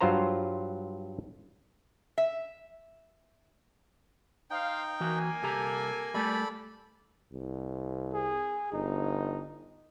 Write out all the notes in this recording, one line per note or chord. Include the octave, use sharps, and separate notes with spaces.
G2 F#3 F4 C5 A#5
E5
D#4 C5 F5 G5
E3 A#3 F#4 G#5
C2 G4 A4 A#5
G3 A3 A4 D5 B5
C2
G#4
G1 D#4